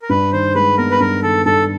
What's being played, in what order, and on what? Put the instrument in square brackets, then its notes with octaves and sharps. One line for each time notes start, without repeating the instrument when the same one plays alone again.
[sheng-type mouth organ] A#4
[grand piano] G2 [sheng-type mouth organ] B4
[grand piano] D#3 [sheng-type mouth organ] C5
[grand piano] G#3 [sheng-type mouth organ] B4
[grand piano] B3 [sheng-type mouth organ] A#4
[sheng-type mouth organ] B4
[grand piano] G2 [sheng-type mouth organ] A#4
[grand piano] D#3 [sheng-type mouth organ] A4
[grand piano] G2 [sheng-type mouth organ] A4